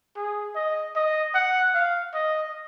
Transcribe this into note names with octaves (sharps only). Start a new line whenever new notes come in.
G#4
D#5
D#5
F#5
F5
D#5